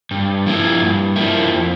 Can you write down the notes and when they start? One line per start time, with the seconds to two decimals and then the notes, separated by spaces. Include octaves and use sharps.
0.11 G2
0.46 F3 A#3 E4
0.81 G2
1.16 F3 A#3 E4
1.49 F2